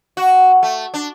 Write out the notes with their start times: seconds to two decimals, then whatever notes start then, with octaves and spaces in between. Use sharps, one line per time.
0.17 F#4
0.63 A3
0.94 D4